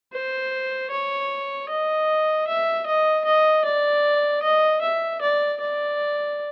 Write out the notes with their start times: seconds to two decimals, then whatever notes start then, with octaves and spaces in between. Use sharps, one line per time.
0.13 C5
0.90 C#5
1.69 D#5
2.47 E5
2.86 D#5
3.25 D#5
3.65 D5
4.42 D#5
4.81 E5
5.21 D5
5.60 D5